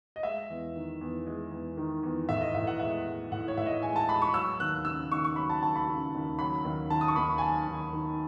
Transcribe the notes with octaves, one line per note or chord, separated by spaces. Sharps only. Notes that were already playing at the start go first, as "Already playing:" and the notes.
D#5
G#3 E5
E2
D#3
E2
G#3
E2
D#3
E2
A2 E5
D#5
A2 E5
F#5
G#3 E5
G#3
A2 F#5
C#5
A2 E5
D#5
G#3 G#5
A5
G#3 B5
C#6
F#3 E6
D#2 F#6
C#3 E6
D#2 C#6
C#6
F#3 B5
A5
D#2 A5
B5
C#3
D#2
F#3 B5
D#2
D#3 A5
D#6
C#6
D#2 B5
G#5
F#3 A5
D#2
D#3